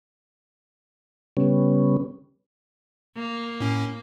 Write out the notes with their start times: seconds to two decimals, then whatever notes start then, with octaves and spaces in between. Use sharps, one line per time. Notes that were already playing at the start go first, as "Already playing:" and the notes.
1.37 C#3 G3 B3 C#4
3.17 A#3
3.60 A2 C#4